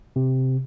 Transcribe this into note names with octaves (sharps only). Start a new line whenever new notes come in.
C3